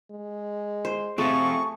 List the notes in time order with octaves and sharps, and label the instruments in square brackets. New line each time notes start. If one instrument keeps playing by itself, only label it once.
[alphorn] G#3
[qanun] C5
[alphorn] C3 [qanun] A3 G#4 [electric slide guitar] C4 F4 A4 [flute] C#6